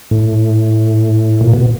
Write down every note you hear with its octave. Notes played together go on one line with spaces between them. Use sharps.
A2
A#2
B2